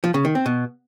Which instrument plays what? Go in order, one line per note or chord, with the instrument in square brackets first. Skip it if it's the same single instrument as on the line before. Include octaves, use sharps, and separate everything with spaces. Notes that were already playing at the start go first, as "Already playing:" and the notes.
[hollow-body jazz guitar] F3
C#3
D#3
C4
B2